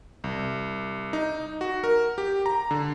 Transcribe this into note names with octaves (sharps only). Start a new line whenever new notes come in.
C2
D#4
F#4
A#4
G4
A#5
D3